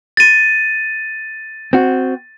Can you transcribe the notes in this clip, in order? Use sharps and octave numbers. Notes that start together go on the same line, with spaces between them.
A6 D#7
C4 F#4